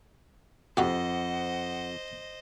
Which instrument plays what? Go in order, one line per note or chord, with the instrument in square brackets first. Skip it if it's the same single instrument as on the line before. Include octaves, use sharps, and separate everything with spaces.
[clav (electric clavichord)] F2 [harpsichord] D#4 F#4 G4 [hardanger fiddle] C5 D#5 [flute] F#5